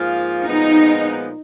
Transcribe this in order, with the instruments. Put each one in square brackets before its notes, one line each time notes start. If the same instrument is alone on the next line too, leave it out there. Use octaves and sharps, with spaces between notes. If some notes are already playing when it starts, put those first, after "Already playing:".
Already playing: [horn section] G#2 F3 A#3 F4 G#4
[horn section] A#2 F3 G#3 B3 [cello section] D#4